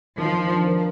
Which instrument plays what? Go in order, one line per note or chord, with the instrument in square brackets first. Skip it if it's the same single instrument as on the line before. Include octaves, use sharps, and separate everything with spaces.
[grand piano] D#3 [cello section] F3
[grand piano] D#3
D4
A#4